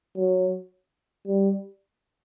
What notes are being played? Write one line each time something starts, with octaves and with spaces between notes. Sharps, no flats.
F#3
G3